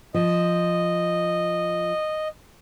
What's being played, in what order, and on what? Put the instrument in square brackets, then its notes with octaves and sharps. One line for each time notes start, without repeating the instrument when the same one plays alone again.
[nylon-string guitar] F3 [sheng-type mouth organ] D#5